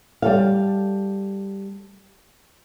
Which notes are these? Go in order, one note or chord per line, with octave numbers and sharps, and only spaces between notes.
G3 A4 F5